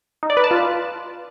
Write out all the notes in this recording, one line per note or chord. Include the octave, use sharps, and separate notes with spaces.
D#4
D5
B4
A5
F4